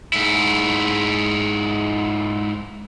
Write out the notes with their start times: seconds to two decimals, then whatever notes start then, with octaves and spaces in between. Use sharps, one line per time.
0.13 G#2 E4